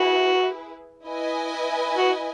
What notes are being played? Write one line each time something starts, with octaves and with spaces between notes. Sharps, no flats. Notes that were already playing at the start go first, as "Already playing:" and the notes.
Already playing: E4 F#4 G#4 B4
E4 B4 D#5 G#5
F#4